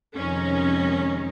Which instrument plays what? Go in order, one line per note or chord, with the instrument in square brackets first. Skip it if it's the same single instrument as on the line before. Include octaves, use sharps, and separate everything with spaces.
[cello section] F2 C3 D#3 G#3 D#4 [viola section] C#4